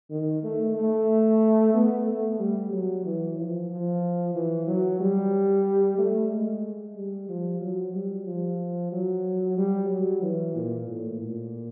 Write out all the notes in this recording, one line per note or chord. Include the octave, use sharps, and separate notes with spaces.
D#3
A3
A3
B3
A3
G3
F#3
E3
F3
F3
E3
F#3
G3
A3
G#3
G3
F3
F#3
G3
F3
F#3
G3
F#3
E3
A#2
A2
A#2